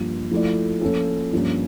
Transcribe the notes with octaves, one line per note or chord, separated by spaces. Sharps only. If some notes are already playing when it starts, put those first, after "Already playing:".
Already playing: G2 F3 A#3
F3 A3 E4 A4 D5
F3 A#3 C#4 F4 A4
G2 F3 A#3 C#4